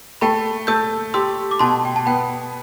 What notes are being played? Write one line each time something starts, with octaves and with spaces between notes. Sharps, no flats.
A3 G5 B5
A3 E6 G6
G4 C6 E6
D6
B2 A5 C6
G5
A5
B3 G5 B5